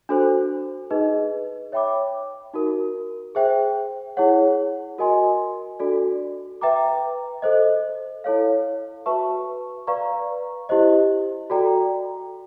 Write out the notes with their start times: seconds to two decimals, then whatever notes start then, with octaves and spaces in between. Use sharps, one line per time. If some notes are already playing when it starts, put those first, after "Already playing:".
0.09 D4 F#4 A4 C5
0.90 D#4 G#4 B4 D#5
1.72 C#5 E5 G5 B5 D6
2.53 D#4 F#4 A#4
3.35 G#4 C5 E5 G5
4.17 E4 G#4 C#5 F#5
4.98 F#4 A#4 D#5 G#5 C6
5.79 D4 F#4 A4 D5
6.61 B4 E5 G5 A#5 D6
7.42 A4 C5 D#5
8.24 E4 A4 C#5 F5
9.06 F#4 B4 E5 A5 C#6
9.87 B4 D5 F5 A#5 C#6
10.69 E4 G4 C5 D#5
11.50 F#4 A4 D5 G5 A#5